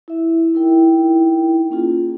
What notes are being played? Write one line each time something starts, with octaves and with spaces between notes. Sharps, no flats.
E4 E5
D#4 E4 A#4 G5
A#3 C#4 F4 G#4